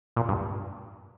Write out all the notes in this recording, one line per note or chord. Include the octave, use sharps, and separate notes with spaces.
A#2
G2